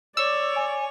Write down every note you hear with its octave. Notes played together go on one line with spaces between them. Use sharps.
C#5 D5 E6
G#5